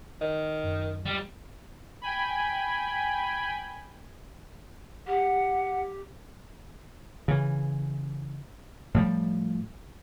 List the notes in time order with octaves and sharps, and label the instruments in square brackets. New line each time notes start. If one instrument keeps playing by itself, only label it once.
[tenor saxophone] D#3 [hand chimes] D#5
[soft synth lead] F#2
[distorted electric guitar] G3
[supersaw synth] G5 G#5 B5
[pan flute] G4 [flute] F#5
[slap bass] C#3 E3
A2 F3 G3